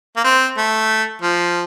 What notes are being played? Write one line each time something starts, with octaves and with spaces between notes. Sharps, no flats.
A#3
C4
A3
F3